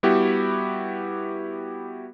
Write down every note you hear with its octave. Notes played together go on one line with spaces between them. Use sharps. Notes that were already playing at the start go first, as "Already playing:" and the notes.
G3 B3 E4 F#4 G4